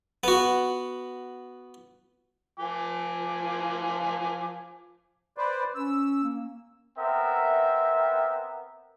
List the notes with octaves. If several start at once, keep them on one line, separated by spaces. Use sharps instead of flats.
B3 F#4
F3 G#5 D6
B4 C5 D5
C#4 E6
A#3
B3 C4 A#4 E5